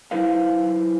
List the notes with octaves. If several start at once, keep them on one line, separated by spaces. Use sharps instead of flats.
F#3 D#4 E4 B4 C5 F5